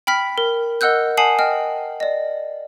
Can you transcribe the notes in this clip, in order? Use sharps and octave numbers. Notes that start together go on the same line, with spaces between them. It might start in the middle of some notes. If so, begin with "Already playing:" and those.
G5 B5 F6 B6
A#4
A#4 D#5 F#5 E6 F#6 G6
F#5 G#5 A5 D#6 C7 F#7
D#5 G5 F6
D5 D#5